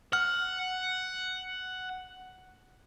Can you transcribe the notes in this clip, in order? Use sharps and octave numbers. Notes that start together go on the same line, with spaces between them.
F#5 F6